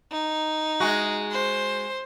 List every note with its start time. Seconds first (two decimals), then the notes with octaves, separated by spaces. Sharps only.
0.12 D#4
0.80 G#3 F#4
1.31 C5